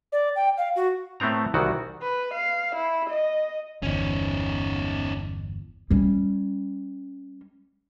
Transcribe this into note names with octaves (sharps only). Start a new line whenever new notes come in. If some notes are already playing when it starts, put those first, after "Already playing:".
D5
G5
F5
F#4
A2 A3 B3 C4 A#5
C2 D#3 E3 F#4
B4
F5
E4
D#5
G1 E2 C#4 D#4
G3 C#4